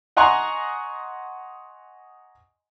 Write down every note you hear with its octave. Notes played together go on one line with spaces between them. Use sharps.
D#5 F#5 G#5 A#5 C6 C#6